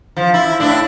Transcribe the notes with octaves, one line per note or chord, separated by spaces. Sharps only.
F3
E4
A2 D4 E4